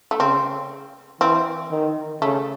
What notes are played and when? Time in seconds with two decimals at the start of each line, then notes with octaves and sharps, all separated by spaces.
0.11 A3
0.20 C#3 C4
1.21 E3 C4
1.71 D#3
2.21 C#3 A3